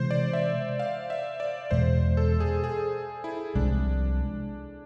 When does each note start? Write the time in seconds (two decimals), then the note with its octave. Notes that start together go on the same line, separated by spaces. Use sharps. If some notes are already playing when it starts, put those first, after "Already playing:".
Already playing: C3 E3 G#3 C5
0.11 D5
0.33 E5
0.79 F5
1.10 E5
1.40 D5
1.71 E2 B2 G#3 C5
2.17 A4
2.40 G#4
2.64 G#4
3.24 E4
3.55 C2 C3 F3 G#3 D4